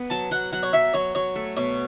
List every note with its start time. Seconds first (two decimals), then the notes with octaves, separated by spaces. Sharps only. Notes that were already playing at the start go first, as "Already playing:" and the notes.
Already playing: B3
0.10 F#3 A5
0.31 F#3 F#5
0.53 F#3 F#5
0.63 C#5
0.73 F#3 E5
0.94 F#3 C#5
1.15 F#3 C#5
1.36 A3
1.56 B2 C#5